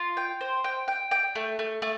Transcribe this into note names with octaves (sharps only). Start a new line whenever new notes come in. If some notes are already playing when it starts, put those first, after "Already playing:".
Already playing: F4
G5
C5
G5
G5
G5
A3
A3
A3